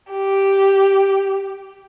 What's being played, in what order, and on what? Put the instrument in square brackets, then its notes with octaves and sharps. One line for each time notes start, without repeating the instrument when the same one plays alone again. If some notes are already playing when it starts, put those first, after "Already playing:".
[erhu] G4